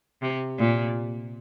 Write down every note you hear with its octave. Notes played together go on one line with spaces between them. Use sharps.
C3
A#2